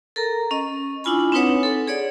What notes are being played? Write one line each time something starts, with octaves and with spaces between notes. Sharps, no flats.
A4 A#4 A#5
C#4 D#5
D4 E4 F4 G#5 B5
C4 D4 D#4 B4 C#5 F#5
A4
G#4 C#5 D5 F#5